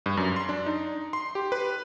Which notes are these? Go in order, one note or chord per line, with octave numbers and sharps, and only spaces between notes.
G2
F#2
C6
D4
D#4
C6
G4
B4